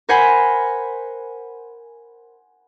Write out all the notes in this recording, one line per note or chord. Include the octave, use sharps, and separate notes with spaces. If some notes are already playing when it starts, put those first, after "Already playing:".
A#4 C5 F#5 G#5 B5